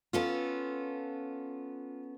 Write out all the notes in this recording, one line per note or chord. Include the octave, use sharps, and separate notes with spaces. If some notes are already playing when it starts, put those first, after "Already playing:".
B3 C#4 F4 A4